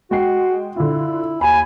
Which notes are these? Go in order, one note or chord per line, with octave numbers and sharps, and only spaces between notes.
G#3 F#4 G5 C7
D3 E4 F4
D#2 G#5 B5